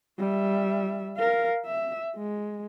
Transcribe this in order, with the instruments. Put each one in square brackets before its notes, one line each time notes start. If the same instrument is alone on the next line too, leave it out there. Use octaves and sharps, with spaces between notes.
[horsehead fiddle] G3 E5
A#4 F5
E5
G#3